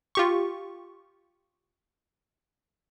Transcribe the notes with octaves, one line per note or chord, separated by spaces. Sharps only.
F4 G4 C#6